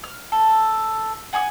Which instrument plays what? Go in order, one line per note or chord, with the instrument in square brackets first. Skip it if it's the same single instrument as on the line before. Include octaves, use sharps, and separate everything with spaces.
[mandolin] F6
A4
F#5 G#5 C#6 D#6